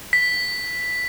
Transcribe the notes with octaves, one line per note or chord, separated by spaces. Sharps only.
B6